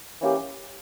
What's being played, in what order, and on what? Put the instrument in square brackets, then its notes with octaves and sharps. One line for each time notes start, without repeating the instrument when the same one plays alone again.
[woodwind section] E3 A#3 C#4 G4